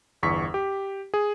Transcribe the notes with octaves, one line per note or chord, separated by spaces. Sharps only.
G1 E2 C#6 B6
G4
G#4